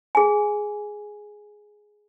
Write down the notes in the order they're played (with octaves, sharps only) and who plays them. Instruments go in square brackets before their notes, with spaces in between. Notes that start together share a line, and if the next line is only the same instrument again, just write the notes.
[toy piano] G#4 G#5